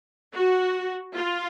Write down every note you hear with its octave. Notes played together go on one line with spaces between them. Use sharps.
F#4
F4